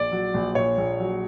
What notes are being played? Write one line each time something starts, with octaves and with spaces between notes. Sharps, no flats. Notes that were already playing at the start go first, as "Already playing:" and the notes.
Already playing: A#1 D5
F#3
A#1
A#2 C#5
A#1
F#3